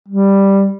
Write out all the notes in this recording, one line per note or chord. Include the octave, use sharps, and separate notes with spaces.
G3